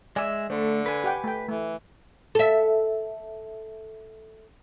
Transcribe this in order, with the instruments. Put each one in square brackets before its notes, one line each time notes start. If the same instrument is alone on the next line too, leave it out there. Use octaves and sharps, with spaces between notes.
[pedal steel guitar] G#3 E5 [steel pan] D5 G#5
[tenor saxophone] D3 [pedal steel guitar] A3 [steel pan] C5
[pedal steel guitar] B4 G#5
[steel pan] G4 F#5 G5
A3 G5
[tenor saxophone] E3 [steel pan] A3
[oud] A4 E5